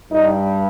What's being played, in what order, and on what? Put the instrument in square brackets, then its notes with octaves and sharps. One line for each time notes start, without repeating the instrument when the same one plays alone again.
[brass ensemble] G2 G3 D#4